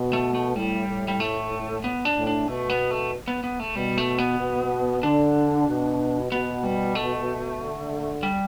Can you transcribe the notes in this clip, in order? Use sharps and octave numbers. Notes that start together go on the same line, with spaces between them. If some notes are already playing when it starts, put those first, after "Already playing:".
Already playing: B2
A3
A3
A2 G3
A2
G3
A3
B3
D4
A2
D4
B2 A3
B3
A3
B3
B3
A3
B2 G3
A3
B3
B2
D3 D4
B2
B2 B3
G3
A3
D3
G3